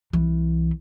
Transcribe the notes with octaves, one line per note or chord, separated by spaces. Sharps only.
C2 E3